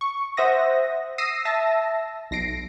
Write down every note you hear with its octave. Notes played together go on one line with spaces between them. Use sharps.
C#6
C5 E5 F#5 D#6 A#6
D#6 E6 A#6 C7 D#7
E5 A5 E6 A#6
B1 A#6 C7 D7